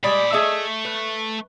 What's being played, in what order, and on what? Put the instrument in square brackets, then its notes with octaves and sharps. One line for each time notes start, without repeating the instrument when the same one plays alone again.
[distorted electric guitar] A#2 B5 [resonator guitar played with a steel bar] G3 G#3 D5
[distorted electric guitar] A3 [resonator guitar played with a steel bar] G#4 D#5 E5
[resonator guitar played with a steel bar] B4